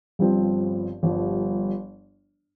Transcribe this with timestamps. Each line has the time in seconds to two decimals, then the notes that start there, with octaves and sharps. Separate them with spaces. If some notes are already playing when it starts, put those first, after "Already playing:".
0.19 G1 G2 F3 C4
1.03 G1 G2 F3